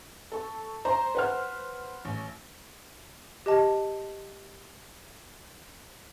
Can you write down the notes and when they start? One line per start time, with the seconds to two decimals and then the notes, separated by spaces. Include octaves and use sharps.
0.32 A4 C#6
0.85 C5 A#5
1.15 B4 F#5 F6
2.05 A1
3.46 G4 D#5 A5